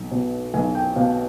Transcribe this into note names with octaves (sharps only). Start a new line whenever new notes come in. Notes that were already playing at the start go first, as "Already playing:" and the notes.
Already playing: B1
B2
B1 G#5
G5
B2 F5